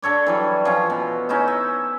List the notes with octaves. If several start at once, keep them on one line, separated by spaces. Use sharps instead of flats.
D3 A4 C#5 D5
E3 F#3 G3
F3 C#4 C#5
B2
C#4 D#4 E4 C5
E5